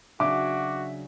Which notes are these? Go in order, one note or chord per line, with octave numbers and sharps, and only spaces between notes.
C#3 F#3 D4 F#4 E5 D6